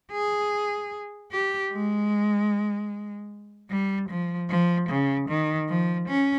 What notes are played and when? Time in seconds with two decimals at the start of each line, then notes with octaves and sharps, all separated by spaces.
0.12 G#4
1.32 G4
1.72 G#3
3.70 G3
4.10 F3
4.50 F3
4.89 C#3
5.29 D#3
5.69 F3
6.08 C#4